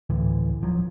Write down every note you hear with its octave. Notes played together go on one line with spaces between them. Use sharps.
D2 A2 D3 E3
D1 F3 F#3